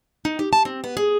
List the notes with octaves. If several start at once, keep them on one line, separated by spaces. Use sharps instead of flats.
D#4
G4
A5
C4
B3
G#4